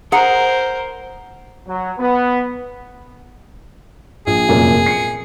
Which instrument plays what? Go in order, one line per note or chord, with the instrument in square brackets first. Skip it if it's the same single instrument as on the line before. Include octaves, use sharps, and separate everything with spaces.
[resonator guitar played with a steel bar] G#4 F#5 A#5 [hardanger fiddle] A#4 C5
[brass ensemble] F#3
B3
[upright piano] A#1 [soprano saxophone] G#4
[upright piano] F1 F#2 A#2
C7 C#7